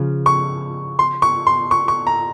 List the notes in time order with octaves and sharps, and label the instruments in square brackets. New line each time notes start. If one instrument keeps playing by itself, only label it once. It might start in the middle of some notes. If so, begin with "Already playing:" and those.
Already playing: [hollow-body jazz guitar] C#3 F3
[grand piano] C#6
C6
C#6
C6
C#6
C#6
A#5